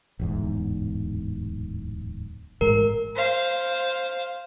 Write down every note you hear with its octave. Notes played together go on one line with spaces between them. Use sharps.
D1 E2 G#2
A1 G#2 G#3 A#4
C5 F5